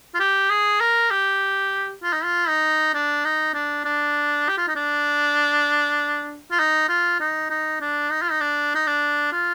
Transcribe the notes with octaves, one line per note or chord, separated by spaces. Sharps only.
F4
G4
G#4
A#4
G4
F4
D#4
F4
D#4
D4
D#4
D4
D4
G4
F4
D#4
D4
F4
D#4
F4
D#4
D#4
D4
D#4
F4
D#4
D4
D#4
D4
F4